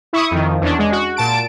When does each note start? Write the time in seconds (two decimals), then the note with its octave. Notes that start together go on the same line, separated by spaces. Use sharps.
0.13 E4 C#6 D#6
0.31 F2 D#3
0.61 E2 C#4 D4
0.79 G#3
0.92 F#4
1.17 A#2 A5 D7